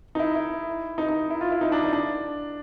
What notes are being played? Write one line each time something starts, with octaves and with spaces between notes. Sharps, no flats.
D#4
E4
E4
D#4
D#4
E4
F4
E4
D#4
D4
D#4
D4